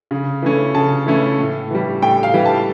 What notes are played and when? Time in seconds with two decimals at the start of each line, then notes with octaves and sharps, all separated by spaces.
0.11 C#3
0.42 E3 A3 C#4
0.74 C#3 A5
1.07 E3 A3 C#4
1.39 A2
1.71 E3 G3
2.02 A2 G5
2.23 F5
2.34 E3 G3
2.45 A5